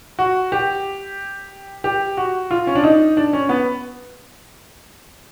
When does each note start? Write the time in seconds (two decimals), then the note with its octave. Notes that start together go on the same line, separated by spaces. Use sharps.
0.19 F#4
0.52 G4
1.84 G4
2.17 F#4
2.51 F4
2.67 C#4
2.75 D4
2.84 D#4
3.17 D4
3.33 C#4
3.49 B3